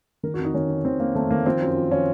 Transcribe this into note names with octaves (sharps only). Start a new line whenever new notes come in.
D#3 A#4
F#4
F2
D#4
D#3 C#4
F2
D#3 C4
F2 A#3
D#3 A3
D#3 A#3
F3 C4
F#2
F3
F3 C#4